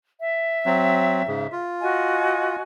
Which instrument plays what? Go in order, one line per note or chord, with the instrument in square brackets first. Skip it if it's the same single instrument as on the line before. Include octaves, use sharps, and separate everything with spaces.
[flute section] E5
[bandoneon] F#3 C4
G#2 C#3
F4
[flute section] F#4 D#5 G#5